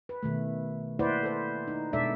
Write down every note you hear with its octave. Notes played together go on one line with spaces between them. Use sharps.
B4
B2 D#3 A3
A#3 E4 B4 C5 D5 F#5
A4 C5
D#4
B2 G#3 D4 A4 D5 E5